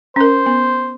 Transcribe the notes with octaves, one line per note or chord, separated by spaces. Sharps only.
C#4 A#4 C5
B3